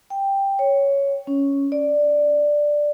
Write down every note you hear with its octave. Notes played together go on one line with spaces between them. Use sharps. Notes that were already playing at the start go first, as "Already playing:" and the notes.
G5
C#5
C#4
D5